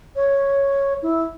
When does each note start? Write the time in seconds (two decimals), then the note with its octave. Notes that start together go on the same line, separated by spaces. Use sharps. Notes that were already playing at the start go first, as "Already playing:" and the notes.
0.16 C#5
1.03 E4